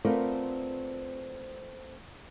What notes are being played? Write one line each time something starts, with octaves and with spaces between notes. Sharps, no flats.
A3 B3 C4 F4 A#4 D5